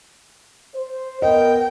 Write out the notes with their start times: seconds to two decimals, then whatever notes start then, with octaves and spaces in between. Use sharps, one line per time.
0.75 C5
1.22 B3 A#4 D#5 G5